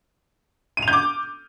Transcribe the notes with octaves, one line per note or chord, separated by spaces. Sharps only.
D#7
F7
G6
D6